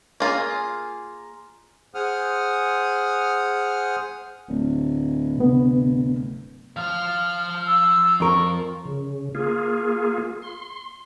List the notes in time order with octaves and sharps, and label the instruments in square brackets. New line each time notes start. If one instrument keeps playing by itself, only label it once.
[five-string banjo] A#3 F4 G#4
[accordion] G#4 C5 F#5 D#6 F6
[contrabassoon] D1
[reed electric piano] C3 B3
[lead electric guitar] F3 F5 [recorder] F6
[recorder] E6
[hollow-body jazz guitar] F2 A#4 [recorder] C#6
[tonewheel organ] C#3
A#3 F4 G#4
C6